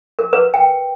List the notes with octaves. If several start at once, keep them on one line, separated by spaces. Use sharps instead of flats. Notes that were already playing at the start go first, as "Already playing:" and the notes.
A#4
B4
G5